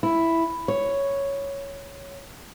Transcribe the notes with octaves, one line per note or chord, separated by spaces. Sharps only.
E4
C#5